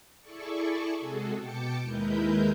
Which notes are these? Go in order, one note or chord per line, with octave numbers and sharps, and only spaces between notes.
E4 G#4 A4 D5 C#6
C3 G#3 F#4 G#4 A4
B2 G5 A5 D6 C#7
D#2 G#3 E4 A#4 B4 G6